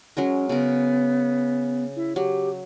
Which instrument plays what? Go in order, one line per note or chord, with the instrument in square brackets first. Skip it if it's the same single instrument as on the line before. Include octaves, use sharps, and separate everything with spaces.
[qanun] F#3 G#3 A#4 [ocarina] C#4
[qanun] C#3 A#4 [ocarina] B3
[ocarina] E4
[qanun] F#3 [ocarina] G4